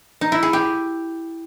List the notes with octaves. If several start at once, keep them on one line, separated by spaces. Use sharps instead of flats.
D#4
E4
G#4
G4